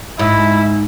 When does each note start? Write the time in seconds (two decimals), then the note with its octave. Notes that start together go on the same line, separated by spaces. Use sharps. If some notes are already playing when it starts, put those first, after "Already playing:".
0.19 G#2 E4